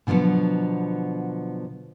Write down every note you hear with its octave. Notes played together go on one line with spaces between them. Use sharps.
B2 D3 F3 F#3 B3